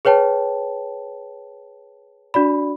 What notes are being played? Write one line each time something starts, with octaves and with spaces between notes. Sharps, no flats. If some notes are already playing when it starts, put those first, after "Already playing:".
G#4 B4 C#5 G5 A5
D4 F#4 D5 B5